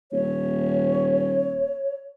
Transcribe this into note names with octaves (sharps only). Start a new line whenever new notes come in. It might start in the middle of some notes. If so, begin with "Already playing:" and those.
D#1 C#5